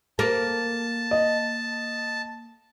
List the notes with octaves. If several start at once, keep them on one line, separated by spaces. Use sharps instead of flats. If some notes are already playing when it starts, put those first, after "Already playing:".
A#3 A5
D#5